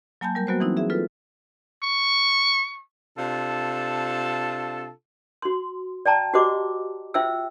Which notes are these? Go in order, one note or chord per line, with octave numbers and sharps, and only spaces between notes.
F#3 A#3 G#5 A5 B5 G6
G3 A#4 G6
F#3 A#3 B3 F#4 B4 C5
E3 C4 D#4 E4
G#4 E5
F4 A4 B4
C#6
C3 D4 F4 A4 A5
F#4 C6
D5 G5 A5 A#5
F#4 G4 C5 D#5 D6
F4 C5 E5 G5 E6